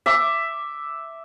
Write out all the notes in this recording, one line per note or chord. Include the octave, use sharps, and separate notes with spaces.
E5 D6